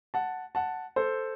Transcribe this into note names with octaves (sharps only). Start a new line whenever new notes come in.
F#5 A5
F#5 A5
A4 C5